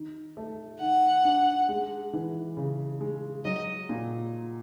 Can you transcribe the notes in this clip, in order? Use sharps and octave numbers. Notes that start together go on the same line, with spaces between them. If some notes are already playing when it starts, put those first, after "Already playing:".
Already playing: D#3
A3
D#3 F#5
D4
G#3
E3
C#3
G#3
F#3 D#5
A#2